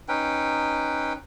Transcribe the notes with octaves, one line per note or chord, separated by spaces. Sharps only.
C#4 D#4 B4 G5